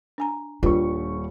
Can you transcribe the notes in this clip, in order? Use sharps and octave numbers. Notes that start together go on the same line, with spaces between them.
D4 G#5 A#5
D#1 G3 D4 F4 B4 C#6